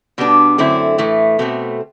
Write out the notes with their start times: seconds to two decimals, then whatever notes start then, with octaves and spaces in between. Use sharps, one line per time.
0.18 B2 G3 B3 D4
0.58 F#2 D3 A3 C4 E4
0.98 A2 E3 A3
1.39 B2 A3 C4